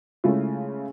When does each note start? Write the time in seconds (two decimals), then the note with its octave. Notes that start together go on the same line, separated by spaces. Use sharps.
0.24 C#3 G#3 A3 E4 F4